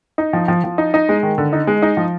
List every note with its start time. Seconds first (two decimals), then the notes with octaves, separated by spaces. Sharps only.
0.18 D#4
0.33 F3
0.48 F3
0.64 F3
0.78 D#4
0.94 D#4
1.09 G#3
1.23 D#3
1.38 D3
1.53 D#4
1.67 G#3
1.82 D#4
1.97 F3